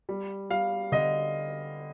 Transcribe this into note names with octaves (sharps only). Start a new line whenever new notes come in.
G3
G3 F5
D3 D#5